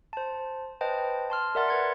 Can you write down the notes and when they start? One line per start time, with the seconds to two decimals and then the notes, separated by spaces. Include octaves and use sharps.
0.13 C5 A5
0.81 B4 C5 D#5 G5 A5
1.30 A5 C6 F6
1.55 A#4 D5 E5 F#5 C6 A6
1.68 B4 G#6 C#7